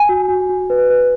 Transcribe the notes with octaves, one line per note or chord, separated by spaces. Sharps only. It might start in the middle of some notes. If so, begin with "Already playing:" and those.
Already playing: G#5
F#4
F#4
F#4
B4
B4